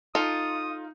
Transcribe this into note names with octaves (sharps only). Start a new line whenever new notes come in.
D#4 F4 A4 D#6